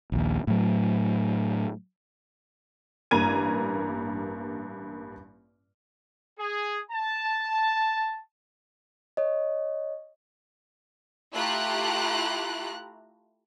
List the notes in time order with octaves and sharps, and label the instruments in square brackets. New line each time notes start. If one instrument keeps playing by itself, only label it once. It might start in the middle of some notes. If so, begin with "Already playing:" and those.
[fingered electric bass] A#1 D#2
A2 F#3
[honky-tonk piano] A1 G2 A#3 A#5 G#6 D#7
[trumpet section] G#4
A5
[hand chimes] C#5 D#5
[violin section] A3 E4 F4 G4 A#5 F#6